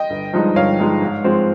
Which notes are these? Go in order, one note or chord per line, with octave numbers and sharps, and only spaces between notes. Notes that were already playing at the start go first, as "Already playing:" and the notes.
Already playing: D#5 G5
G1
G2 F3 G#3 D#4
G1 C#5 F5
G2 F3 G#3 D#4
G#2
F3 G#3 C4